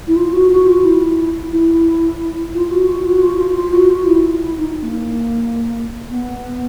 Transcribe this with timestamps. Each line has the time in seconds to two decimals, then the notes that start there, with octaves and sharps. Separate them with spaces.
0.07 E4
0.16 F4
0.33 F#4
0.50 F#4
0.66 F4
0.84 E4
1.52 E4
2.54 F4
2.71 F#4
2.87 F4
3.05 F#4
3.22 F4
3.38 F4
3.55 F4
3.73 F#4
3.90 F4
4.06 E4
4.58 D#4
4.83 A#3
6.10 B3